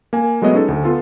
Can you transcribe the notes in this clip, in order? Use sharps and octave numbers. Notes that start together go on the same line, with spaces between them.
A#3 G#5
F#3 G#3 A3 B3 D#5
C#4 D#4 G#4 A4
D2
B3 F4 A4